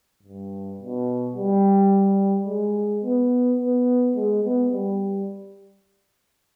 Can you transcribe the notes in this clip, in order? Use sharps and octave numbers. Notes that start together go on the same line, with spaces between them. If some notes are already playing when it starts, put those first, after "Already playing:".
G2
B2
G3
G#3
B3
B3
G#3
B3
G3